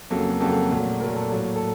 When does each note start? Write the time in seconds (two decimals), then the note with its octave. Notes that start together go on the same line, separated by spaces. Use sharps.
0.10 F2 C#3 F#3 A#3 A4
0.40 F2 C#3 F#3 A#3 A4
0.71 A#2 F#3 A3
1.00 A#2 F#3 A3 A#4
1.15 A4
1.30 A2 F#3 A#3 A4
1.56 A4